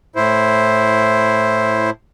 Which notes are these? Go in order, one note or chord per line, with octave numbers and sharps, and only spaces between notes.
A2 E4 C5